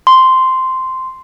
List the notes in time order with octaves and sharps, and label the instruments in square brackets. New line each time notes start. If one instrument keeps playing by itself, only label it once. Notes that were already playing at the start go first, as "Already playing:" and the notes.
[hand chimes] C6